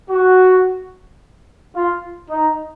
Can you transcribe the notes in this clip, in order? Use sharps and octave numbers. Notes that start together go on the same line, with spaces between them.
F#4
F4
D#4